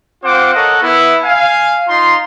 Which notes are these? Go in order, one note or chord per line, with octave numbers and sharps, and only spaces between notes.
C4 F4 C5 F#5 D6
A4 A#4 C#5 D#5 F#5
B3 E4
F5 G#5
D#4 F4 A#5 C6